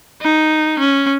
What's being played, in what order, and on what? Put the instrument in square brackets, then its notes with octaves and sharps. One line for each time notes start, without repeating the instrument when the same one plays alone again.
[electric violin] D#4
C#4